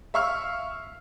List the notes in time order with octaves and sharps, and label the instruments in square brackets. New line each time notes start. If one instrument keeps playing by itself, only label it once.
[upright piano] E5 F5 C#6 E6 F6